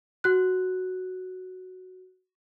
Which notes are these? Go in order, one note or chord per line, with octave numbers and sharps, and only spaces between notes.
F#4 F#6